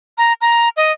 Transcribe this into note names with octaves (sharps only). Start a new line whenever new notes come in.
A#5
A#5
D#5